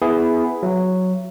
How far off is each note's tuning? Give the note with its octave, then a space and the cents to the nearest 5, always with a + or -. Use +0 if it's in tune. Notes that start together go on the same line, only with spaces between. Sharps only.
B3 +15 E4 +0 G#4 +0
F#3 -5 E5 +35